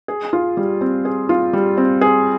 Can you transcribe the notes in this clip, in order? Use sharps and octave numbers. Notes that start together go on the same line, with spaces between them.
G#4
F4
G3
C4
G#4
F4
G3
C4
G#4